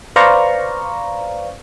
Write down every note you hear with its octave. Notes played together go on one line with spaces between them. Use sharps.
B4 C5 D5 F5 A#5 C#6